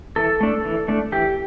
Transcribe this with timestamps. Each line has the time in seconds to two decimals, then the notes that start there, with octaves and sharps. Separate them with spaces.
0.16 E3 A4
0.41 A3 D4
0.65 E3
0.88 A3 D4
1.12 E3 G4